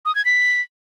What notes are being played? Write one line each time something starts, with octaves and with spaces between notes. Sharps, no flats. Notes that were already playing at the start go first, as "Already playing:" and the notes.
D#6
G#6
B6